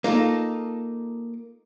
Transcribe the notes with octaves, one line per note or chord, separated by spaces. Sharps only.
A#3 D#4 F4 A4